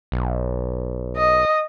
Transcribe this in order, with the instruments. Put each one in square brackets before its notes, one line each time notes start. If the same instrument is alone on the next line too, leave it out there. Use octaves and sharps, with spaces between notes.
[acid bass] B1
[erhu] D#5